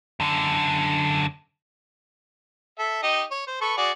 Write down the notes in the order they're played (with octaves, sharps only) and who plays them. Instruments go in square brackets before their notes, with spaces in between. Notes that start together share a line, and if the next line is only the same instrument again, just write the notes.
[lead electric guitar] F#2 D3
[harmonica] A4 E5
D#4 G4 D#5
C#5
C5
A4 B4 C#6
F#4 G#4 D5